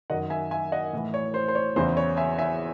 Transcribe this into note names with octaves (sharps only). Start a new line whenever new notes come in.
F#2 D#3 D#5 F#5
E5 G#5
E5 G#5
D#5 F#5
A2 E3
C#5
C5
C5
C#5
E2 C#3 E3 C5
C#5
E5 G#5
E5 G#5